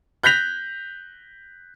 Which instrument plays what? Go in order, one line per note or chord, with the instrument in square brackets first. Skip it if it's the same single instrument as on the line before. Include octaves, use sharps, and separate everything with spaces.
[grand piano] F#6 G6 A#6 B6 F7